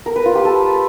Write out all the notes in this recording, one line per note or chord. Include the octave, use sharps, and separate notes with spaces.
A#4
B4
F4
G4
A4